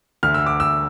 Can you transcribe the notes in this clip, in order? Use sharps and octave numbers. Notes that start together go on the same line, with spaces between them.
D2 D3 F6
E6
D6
E6